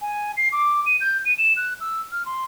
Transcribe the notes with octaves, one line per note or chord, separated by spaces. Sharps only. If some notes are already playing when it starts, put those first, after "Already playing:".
G#5
C7
D6
D#7
G6
D#7
E7
F#6
E6
F6
C6